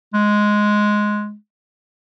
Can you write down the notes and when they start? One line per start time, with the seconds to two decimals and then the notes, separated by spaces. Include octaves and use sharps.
0.14 G#3